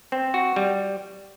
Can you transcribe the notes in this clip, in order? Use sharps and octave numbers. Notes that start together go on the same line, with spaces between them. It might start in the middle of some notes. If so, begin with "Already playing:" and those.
C4
F#4
G3